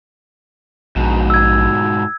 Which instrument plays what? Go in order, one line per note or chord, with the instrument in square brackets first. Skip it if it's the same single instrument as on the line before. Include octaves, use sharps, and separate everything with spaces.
[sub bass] A#1 [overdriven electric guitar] G#2 B2
[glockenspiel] E6 G#6